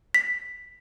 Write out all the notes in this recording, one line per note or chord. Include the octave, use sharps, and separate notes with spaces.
B6